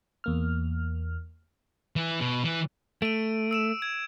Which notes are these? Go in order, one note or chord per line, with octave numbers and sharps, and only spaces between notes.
E2 A#3 F6
E3
B2
E3
A3 D7 D#7
E6 D7 E7
G#6